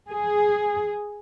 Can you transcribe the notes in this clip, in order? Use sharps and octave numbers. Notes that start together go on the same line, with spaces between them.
G#4